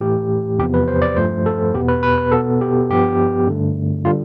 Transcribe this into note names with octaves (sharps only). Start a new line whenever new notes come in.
A2 E3 A3 G4
E2 C3 F3 B3 G4
B4
C5
D5
G2 F3 A3 C5
A4
E2 B2 B3 G4
B4
B4
B4
B2 B3 A4
G4
G2 F3 B3 G4
G2 D3 A3
D3 G3 F4